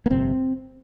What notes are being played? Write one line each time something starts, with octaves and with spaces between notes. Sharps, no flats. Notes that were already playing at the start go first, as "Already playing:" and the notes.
A#3
G1 F2 C3 C4